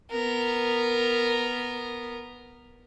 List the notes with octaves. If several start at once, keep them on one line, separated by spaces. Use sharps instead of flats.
B3 A#4